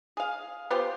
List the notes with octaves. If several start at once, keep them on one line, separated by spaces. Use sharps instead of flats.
G#4 F5
B3 F4 G4 C5